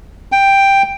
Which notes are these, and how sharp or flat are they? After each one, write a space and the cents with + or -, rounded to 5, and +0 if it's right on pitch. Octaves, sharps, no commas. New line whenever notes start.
G5 +5